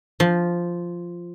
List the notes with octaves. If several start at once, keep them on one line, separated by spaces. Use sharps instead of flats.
F3